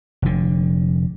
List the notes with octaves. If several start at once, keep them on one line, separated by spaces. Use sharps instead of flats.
F1 D3